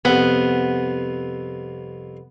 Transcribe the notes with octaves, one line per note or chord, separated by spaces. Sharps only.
C2 F2 B3